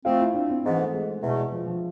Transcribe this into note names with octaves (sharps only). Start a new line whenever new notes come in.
F3 A3 C4 F4
E4
D4
C4
G#2 E3 B3 C4
A3
G#3
E2 B2 A3
F3
F3